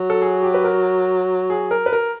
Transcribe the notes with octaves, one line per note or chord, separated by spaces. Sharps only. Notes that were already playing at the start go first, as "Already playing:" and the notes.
Already playing: F#3
A4
G#4
G4
B4
A#4
G#4
A#4
B4
A#4